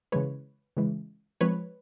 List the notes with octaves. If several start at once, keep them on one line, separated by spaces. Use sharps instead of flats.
C#3 E3 G#3 B4 C#5
C#3 E3 G#3
F3 G#3 C4 B4 C#5